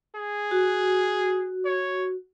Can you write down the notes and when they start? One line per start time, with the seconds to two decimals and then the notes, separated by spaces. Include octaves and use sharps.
0.16 G#4
0.51 F#4
1.65 C#5